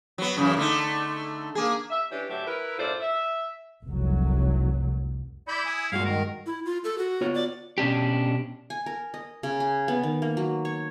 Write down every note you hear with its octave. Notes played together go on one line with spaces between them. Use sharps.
F#3 B3
F#2 C#3 E3
D3 A3 D#4
A#3 G#4
E5
E3 C#4 D4 G4
A2 D3 F#3 G4 A4 E5
E4 A#4 B4
F#2 A2 F4 A4 C5 D5
E5
F1 C2 F#3
E4 D5 B5 G6
G#5 D#6
G2 A#2 G#3 F#4 F5
D#3 A#4
E4
F4
A4
F#4
B3 F4 C#5
D5
B2 C#4 D4 G4
G#5
A#4
D#5
C#3
G#5
B3
D#3
A#3
F#3
C#5